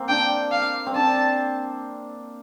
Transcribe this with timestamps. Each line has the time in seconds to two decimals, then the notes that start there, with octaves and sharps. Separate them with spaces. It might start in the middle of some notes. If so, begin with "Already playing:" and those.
Already playing: A#3 C4
0.09 D4 G5
0.52 F5
0.86 C4
0.95 D4 A5